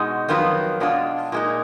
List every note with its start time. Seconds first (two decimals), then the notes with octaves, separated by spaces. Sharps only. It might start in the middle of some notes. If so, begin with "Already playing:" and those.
Already playing: B2 G#3 D#4 F#4
0.29 F2 D#3 F#3 B3 F4
0.80 B2 G#3 D4 F4
1.32 A#2 G#3 D#4